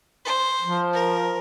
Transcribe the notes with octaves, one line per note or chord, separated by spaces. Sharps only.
C5
F3
A#4